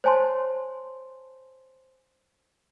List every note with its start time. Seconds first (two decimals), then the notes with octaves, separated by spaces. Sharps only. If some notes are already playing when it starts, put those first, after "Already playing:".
0.04 C5 C#5 G#5 A5 C6